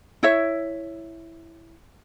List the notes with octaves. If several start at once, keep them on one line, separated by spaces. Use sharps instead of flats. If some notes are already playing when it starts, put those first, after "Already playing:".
E4 C#5 E5